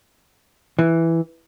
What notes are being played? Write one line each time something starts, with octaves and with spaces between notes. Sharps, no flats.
E3